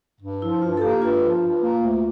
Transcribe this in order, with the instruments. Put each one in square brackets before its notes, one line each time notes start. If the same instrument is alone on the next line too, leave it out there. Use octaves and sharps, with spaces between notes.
[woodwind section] G2
[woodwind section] F3 [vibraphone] E4
[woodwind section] G2 [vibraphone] F4
[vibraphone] A4
[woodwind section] A#3 [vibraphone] G4
[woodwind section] G2 [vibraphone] F4
[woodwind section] F3
G2
A#3
D2